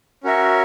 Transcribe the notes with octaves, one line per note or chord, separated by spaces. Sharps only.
C#4 F#4 A#4 C#5 E5